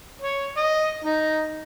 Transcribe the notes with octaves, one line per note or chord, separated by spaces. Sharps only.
C#5
D#5
D#4